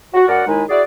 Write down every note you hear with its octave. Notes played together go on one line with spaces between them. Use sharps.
F#4
F#2 F#4 A#4 D5 F#5
D#2 D#3 G#3 D#4 E4 G#5
E4 F#4 G#4 D5